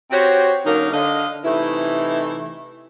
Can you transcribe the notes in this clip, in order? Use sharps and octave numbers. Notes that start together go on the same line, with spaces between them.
C4 F#4 G4 C5 C#5
D3 F#3 A#3 C#4 D#4 A#4
D3 D#5 F5
C3 E3 A3 D#4 E4